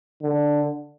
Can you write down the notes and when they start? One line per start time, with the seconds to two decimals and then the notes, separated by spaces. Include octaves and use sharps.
0.22 D3